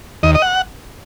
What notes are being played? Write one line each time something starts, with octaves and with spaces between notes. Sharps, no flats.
D#2 D#5
D#5
F#5